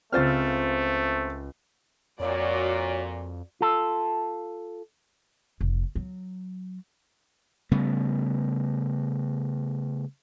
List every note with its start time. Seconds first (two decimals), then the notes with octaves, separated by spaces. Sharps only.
0.12 C#2 A3 C4 F4 C5 F6 A6
2.20 F2 A#2 F#4 C#5 D5
3.61 F4 A4
5.61 F1
5.95 F#3
7.72 C#3 G3 A3 B3